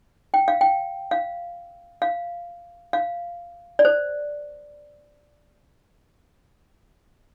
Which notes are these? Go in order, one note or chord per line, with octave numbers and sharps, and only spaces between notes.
G5
F5
G5
F5
F5
F5
D5
C5